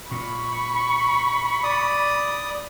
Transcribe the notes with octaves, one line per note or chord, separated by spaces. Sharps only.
A#2 B5 C#6
D5 D#6